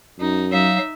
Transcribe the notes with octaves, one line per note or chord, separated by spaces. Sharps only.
F#2 D#4
F#3 D#4 E5 F5